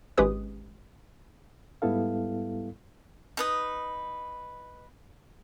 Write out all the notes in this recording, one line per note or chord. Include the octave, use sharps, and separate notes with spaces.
G#1 G#3 C#4 G4 B4 D#6
G#2 G3 B3 E4 A4 F5
D#4 B4 D#6